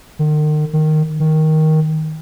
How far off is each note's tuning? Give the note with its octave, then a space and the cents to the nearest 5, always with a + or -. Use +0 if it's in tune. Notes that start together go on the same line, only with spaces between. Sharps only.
D#3 -40
D#3 -10
D#3 +10